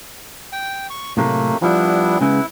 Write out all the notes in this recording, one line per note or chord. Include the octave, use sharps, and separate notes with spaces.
G5
C#6
A2 C3 F#3 A3 A#3
F3 G3 B3 D4 E4
C#3 G#3 B3 E4